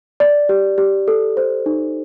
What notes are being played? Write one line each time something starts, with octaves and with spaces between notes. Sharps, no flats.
D5
G4
G4
A4
C5
D#4